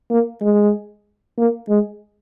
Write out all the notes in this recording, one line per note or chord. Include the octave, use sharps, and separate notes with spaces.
A#3
G#3
A#3
G#3